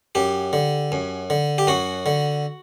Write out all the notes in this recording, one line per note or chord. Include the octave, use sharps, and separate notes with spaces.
F#2 G4
D3
F#2
D3
G4
F#2 F#4
D3